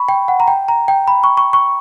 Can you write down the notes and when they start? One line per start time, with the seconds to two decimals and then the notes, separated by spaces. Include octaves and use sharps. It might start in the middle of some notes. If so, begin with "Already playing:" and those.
Already playing: B5 C#6
0.09 G5
0.28 F#5
0.40 A#5
0.48 G5
0.68 A#5
0.88 G5
1.08 B5
1.24 C#6
1.37 C#6
1.53 C#6